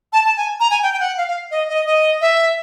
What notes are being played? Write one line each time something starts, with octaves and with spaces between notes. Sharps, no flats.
A5
A5
G#5
A#5
G#5
G5
G5
F#5
F5
F5
D#5
D#5
D#5
E5